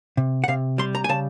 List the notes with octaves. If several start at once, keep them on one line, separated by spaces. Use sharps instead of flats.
C3
F#5
C3 F5
G3 C6
A#5
G#5
C#3 A5